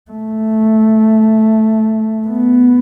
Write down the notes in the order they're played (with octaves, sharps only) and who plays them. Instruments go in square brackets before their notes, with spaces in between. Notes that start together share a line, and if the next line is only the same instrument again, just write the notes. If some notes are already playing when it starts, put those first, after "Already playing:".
[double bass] A3
B3